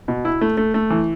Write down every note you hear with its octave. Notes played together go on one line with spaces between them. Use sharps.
B2
E4
A3
A3
A3
E3